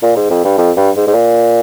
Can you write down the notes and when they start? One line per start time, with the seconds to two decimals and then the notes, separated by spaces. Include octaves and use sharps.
0.03 A#2
0.16 G#2
0.30 F2
0.45 G2
0.58 F2
0.77 G2
0.96 G#2
1.07 G#2
1.14 A#2